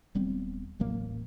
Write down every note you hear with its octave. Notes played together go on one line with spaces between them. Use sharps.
D#1 G3 B3 C4
D#1 A1 F#3 A#3